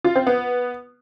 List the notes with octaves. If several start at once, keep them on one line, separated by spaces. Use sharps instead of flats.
F4
C4
B3